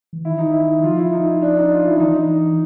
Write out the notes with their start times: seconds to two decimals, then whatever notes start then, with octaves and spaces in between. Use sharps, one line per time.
0.13 E3
0.25 D#3 E4
0.38 D#4
0.52 E4
0.83 F3 F4
0.98 E4
1.13 D#4
1.42 D4
1.57 D#4
1.72 F4
1.86 E4
1.95 D4
2.00 E3 D#4